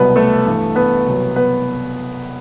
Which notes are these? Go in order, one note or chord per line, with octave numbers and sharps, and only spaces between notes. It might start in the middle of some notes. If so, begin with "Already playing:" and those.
Already playing: C2 B2 F#3 B3 B4
A3 A4
G2 E3
B3 B4
C2 B2 F#3
B3 B4